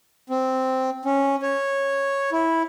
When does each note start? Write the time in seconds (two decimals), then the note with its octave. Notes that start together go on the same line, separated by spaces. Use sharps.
0.30 C4
1.05 C#4
1.42 C#5
2.32 E4